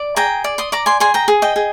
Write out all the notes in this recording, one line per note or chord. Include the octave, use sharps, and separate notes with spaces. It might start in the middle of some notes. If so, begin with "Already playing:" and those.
Already playing: D5
G#4 G5 A#5
D5
C6 D#6
D5 A#5 D6
G#5 C6
G#4 G#5 C6
G5 A#5
G#4
D#5 G5
G#4